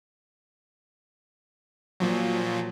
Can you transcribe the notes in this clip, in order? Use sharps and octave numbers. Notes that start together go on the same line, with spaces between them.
A#2 F3 F#3